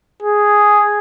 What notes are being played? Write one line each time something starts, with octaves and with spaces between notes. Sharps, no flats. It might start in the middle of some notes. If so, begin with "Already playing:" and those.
G#4